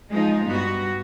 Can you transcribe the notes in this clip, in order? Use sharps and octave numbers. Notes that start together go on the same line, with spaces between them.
F3 G#3 D#4 F4
G2 B3 F#4